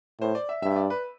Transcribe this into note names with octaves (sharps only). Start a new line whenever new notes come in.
A2 C5
D5
E5
G2 E5
D5
B4